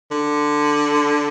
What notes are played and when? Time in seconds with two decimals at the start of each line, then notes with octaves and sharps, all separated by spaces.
0.11 D3